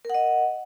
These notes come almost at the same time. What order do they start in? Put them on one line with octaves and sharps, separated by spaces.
A#4 F#5 D#5